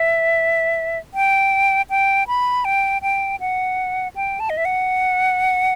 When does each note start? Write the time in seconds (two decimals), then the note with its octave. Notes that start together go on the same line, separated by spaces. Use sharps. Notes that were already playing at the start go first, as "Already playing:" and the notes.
Already playing: E5
1.14 G5
1.90 G5
2.27 B5
2.65 G5
3.02 G5
3.40 F#5
4.16 G5
4.40 A5
4.50 D#5
4.57 E5
4.65 F#5